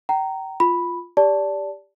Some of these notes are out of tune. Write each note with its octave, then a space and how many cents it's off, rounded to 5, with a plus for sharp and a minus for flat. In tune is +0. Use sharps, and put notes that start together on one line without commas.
G5 -30 A#5 -10
F4 +0 B5 -5
G4 +15 D5 -20 A5 +0